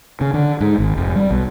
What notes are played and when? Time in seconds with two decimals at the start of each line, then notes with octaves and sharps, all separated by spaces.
0.21 C#3
0.34 D3
0.61 G#2
0.78 G#1
0.97 F1
1.16 G3
1.30 B1